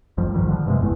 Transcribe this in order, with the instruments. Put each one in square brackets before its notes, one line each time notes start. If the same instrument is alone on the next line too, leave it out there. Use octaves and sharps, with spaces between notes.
[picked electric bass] G1 F2 F3 G3
A#1 G#2 D#3 G3
D3 F3
G2 C3 G#3
G1 E2 A2